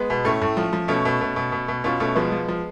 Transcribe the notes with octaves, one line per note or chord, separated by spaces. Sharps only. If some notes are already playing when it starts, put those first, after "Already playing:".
Already playing: G#3 B3
B2
A2 A3 C#4
A2
F3
F3
B2 A3 C#4
B2
B2
B2
B2
B2
B2 C#4 F4
B2 A3 C#4
F3 G#3 B3
F3
F3